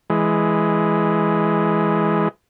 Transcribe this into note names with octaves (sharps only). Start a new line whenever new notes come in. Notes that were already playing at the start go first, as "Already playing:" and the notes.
E3 G#3